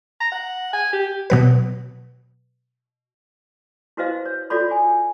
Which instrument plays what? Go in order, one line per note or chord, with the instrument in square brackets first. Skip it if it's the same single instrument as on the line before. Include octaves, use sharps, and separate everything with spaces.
[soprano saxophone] A#5
F#5
G#5
G4
[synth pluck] B2 F#3 B4
[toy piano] E4 F#4 B4 C5 D#5 F5
C#5
F4 F#4 A4 C#5 D5 B5
G#5